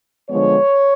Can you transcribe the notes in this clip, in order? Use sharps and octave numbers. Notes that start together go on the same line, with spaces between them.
D3 F3 G#3 B3 C#5